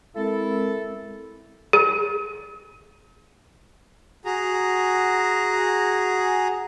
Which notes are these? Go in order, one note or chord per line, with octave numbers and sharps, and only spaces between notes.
G#3 C4 E4 A4 A#4
G#4
F#4 G#4 A#5